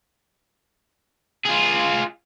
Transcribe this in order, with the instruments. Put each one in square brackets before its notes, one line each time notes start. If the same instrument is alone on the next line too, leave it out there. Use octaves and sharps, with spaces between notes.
[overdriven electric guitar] F4 G#4